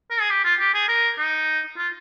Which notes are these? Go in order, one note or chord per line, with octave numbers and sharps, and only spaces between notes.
A#4
G#4
G4
F4
G4
G#4
A#4
D#4
F4